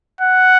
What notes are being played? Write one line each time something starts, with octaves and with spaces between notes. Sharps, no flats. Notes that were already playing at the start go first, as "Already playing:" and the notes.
F#5